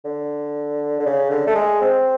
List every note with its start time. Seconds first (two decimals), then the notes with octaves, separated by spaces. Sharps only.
0.05 D3
0.99 D3
1.06 C#3
1.30 D3
1.47 A3
1.55 G#3
1.81 C4